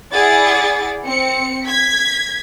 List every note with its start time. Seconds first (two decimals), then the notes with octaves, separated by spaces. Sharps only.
0.13 E4 G#4 D5 F#5 A6
1.06 C4 C#7
1.66 G#6 B6